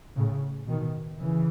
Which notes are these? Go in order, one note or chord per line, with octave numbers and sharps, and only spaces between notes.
A2 C#3
B2 D#3
C#3 E3